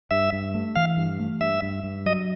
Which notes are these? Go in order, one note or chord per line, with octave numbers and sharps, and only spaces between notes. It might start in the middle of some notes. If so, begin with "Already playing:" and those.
G2 E5
G2
A3
E3 F5
G2
A3
G2 E5
G2
G2
F#3 D#5